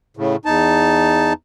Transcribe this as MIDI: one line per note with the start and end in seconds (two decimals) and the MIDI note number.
0.17 0.36 45
0.17 0.36 49
0.45 1.33 40
0.45 1.33 63
0.45 1.33 81